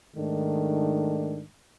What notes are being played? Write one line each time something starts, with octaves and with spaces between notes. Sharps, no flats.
G#2 D#3 A3 D4